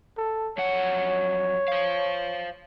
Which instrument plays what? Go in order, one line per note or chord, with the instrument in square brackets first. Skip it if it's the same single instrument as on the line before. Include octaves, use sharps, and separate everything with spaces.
[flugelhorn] A4
[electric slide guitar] F2 F#3 F#5 [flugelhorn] C#5
[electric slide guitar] C5 F5